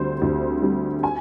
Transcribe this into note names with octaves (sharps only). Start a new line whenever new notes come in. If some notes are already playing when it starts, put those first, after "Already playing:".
Already playing: D2 D3 G3 C4 C5
D2
D3 G3 C4
G#5